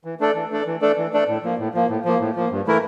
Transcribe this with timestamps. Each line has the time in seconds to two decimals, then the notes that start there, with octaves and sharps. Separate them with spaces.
0.05 E3
0.20 A3 D4 A4 D5
0.35 E3
0.51 A3 D4 A4 D5
0.66 E3
0.81 A3 D4 A4 D5
0.97 E3
1.13 A3 D4 A4 D5
1.28 A2
1.43 F3 A#3
1.58 A2
1.74 F3 A#3
1.89 A2
2.05 F3 A#3
2.21 A2
2.36 F3 A#3
2.51 G2
2.67 E3 A3 E4 A#4